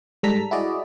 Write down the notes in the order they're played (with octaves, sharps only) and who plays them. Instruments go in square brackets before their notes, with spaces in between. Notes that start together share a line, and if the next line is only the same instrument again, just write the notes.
[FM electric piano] G#2 G3 A4 A5 A#5 B6
E4 F#4 G#4 D5 D#5